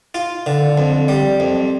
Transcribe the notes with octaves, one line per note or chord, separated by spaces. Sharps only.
F4
D3
F2
G3
F2